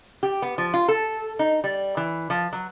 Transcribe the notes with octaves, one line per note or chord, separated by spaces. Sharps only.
G4
B3
F3
F4
A4
D#4
G3
E3
F3
F#3